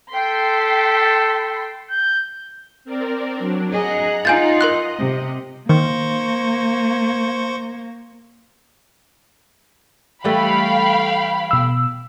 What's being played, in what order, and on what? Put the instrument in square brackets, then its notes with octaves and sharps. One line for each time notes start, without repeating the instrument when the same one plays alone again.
[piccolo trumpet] A4 [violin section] G5 C6 B6
[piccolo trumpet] G6
[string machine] C4 A#4 D5
F#3 D4
[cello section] G#4 D#5 [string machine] F#5 A#5 F#6
[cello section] D#4 F4 [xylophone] G#5 G6 A6
[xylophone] A#4 C6 F#6 [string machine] D#5
[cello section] C3
[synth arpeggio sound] D#3 [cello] A#3 [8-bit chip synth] C5 C#6
[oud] E3 G3 A3 [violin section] F5 G5 B5
[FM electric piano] B2 E6